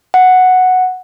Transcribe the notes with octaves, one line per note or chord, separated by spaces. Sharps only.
F#5